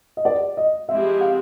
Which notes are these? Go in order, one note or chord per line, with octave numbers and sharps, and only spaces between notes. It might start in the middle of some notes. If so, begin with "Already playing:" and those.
D#5
D5
D#5
F3 G#3 C4 E4 G4 E5
F5